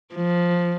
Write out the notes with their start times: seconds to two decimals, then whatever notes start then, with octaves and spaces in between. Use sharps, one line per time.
0.15 F3